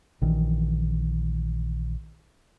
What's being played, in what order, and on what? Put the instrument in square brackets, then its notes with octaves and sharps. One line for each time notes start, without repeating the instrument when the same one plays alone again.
[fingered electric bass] A#1 D#3 E3